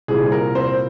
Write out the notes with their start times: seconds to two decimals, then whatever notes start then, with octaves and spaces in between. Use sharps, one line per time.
0.08 C2 A#2 G3 C4 G#4
0.32 A#4
0.55 C4 C5